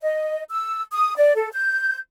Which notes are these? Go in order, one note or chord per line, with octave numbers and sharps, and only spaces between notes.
D#5
E6
D#6
D5
A4
G6